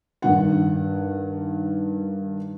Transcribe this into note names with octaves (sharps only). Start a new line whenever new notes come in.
G2 D#3 F#5